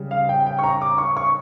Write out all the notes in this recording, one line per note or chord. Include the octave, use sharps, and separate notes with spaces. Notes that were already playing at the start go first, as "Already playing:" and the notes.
Already playing: C#3 G3
F5
G5
G5
C#6
A#5
D6
C#6
C#6